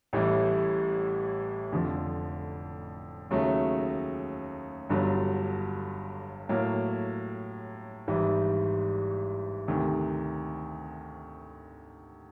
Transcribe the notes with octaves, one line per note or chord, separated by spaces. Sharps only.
A1 A2 E3 G3
F1 F2 D3 F3
D#2 C#3 F#3 A3
G1 G2 D3 F#3
A2 F#3 A#3
G#1 G#2 E3 G3
D2 C3 D#3